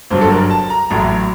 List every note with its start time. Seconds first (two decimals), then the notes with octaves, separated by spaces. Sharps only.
0.11 G1 G2 F#3 C5
0.21 A4
0.30 A#4
0.50 A5
0.70 A#5
0.90 A1 A2 F#3 A#5